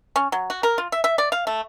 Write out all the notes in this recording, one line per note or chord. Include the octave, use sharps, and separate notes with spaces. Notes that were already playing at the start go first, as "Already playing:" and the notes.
C#4
F#3
F#4
A#4
F4
E5
E5
D5
F5
A3